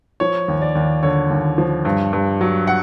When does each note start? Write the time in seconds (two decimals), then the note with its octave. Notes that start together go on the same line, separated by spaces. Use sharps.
0.20 F3 C#5
0.48 D#2
0.62 D5
0.75 D#2
1.03 D3 C#5
1.30 D#2
1.58 F3
1.85 G2
2.13 G2
2.41 F#3
2.67 F#5